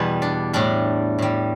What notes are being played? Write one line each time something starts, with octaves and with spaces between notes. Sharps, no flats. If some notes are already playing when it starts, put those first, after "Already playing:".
Already playing: E2 B2 G3 B3
D4
A2 G3 D4
A2 G3